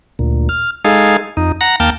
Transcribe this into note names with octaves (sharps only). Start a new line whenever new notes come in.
D2 A#2
F6
G#3 D#4 G#4 A4 F5
F2 D#4
F#5 A#5 A#6
D#2 A#3 G5 A5 F6